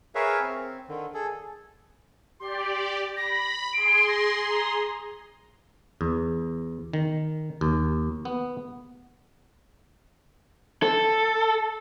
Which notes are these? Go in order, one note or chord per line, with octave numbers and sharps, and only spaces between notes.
G#4 A#4 B4 C#5 E5 F5
C4
D3 D#3
G#4 A4
G4 D5 C6
B5 A#6
G#4 C6 D7
A#6
A#5
E2
D#3
D#2
B3
A4